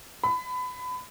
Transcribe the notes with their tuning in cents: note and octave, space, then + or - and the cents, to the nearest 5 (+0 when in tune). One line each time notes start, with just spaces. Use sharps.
B5 +25